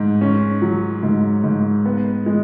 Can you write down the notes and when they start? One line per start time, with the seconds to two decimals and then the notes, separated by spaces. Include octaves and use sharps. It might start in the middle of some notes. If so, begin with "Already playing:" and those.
Already playing: G#2
0.21 C#4
0.62 F#3
1.03 G#2
1.44 G#2
1.85 B3
2.26 G#3